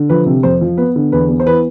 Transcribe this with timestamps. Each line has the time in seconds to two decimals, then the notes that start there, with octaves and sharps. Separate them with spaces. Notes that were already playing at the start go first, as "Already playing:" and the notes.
Already playing: D3
0.09 F3 B4
0.26 C3
0.43 F2 C5
0.61 F3
0.77 B3 B4
0.96 D3
1.12 E2 B4
1.29 B3
1.40 C5
1.46 E3 B4